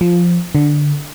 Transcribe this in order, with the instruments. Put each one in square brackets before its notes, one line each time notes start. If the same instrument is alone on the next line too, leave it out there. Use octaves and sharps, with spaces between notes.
[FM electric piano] F3
D3